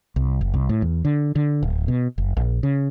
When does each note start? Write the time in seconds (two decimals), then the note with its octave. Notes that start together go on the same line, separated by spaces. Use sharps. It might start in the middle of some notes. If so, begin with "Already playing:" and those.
0.16 C2
0.41 F#1
0.54 C2
0.69 A2
0.82 E2
1.05 D3
1.36 D3
1.63 D1
1.88 B2
2.18 F#1
2.37 A#1
2.63 C#3